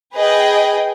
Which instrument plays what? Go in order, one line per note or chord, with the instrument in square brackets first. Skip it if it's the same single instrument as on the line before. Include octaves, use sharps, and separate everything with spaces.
[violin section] G#4 B4 D#5 G5